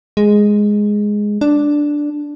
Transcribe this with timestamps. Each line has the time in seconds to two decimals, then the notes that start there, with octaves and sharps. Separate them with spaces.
0.17 G#3
1.41 D4